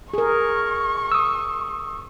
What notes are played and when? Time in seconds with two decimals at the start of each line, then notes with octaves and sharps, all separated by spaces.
0.14 G#4 A#4 C#6
1.12 D#6 E6